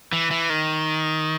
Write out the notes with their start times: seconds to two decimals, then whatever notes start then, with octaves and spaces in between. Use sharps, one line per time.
0.13 E3
0.31 E3
0.50 D#3